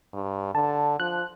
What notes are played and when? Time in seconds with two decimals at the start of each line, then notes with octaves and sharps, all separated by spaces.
0.14 G2
0.55 D3 A5
1.00 F3 F#6